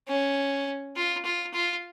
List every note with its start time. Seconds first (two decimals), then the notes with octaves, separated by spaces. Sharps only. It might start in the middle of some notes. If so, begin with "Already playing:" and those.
0.08 C#4
0.96 F4
1.25 F4
1.54 F4